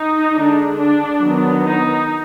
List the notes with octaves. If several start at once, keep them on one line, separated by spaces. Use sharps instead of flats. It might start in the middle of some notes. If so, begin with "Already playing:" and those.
Already playing: D#4
D3 G#3 D4
D4
D#3 F#3 B3
D#4